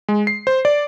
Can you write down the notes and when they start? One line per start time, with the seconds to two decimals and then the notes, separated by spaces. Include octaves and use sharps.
0.08 G#3
0.27 C7
0.47 C5
0.65 D5